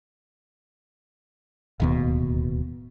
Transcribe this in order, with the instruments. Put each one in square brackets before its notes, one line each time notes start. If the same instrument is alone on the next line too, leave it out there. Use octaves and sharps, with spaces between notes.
[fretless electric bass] D1 D#2 B2